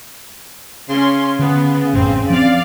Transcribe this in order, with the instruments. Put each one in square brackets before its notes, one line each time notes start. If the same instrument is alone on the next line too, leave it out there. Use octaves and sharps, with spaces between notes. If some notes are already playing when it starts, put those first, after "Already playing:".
[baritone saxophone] C#3 [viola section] C#4 C6
[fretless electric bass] D3 [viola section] B3
[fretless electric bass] A1 F#2 [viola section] C4
[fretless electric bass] F3 C4 [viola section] D5 F5